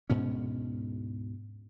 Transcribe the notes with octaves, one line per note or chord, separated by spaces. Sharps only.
D2 G#2 B2 C#4